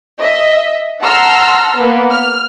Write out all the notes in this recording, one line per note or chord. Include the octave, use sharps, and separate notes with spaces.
D#5 E5
F#5 A5 A#5 C6 E6 F6
A#3 B3
F6